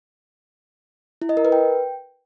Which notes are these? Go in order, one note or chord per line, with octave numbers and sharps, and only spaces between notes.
E4
D#5
A#4
B4
G5